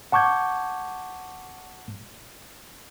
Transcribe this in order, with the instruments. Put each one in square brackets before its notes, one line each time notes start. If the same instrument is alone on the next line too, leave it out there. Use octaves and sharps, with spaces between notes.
[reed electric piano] F#5 A5 C#6 D6 G6 G#6